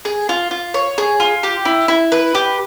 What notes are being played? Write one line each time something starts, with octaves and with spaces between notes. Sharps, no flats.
G#4
F4
F4
C#5
G#4
F4
G4
E4
E4
B4
G4